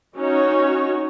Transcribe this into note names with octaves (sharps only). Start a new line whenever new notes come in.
C#4 D#4 F#4 C#5